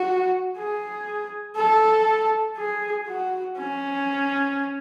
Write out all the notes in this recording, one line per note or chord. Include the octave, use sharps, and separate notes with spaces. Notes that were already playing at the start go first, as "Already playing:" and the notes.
Already playing: F#4
G#4
A4
G#4
F#4
C#4